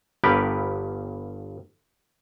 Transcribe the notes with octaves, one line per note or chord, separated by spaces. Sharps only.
G1 G2 B3 G4 A#4 B4